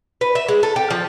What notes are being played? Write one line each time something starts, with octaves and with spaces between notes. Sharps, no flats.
B4
E5
G#3
A4
G4
F3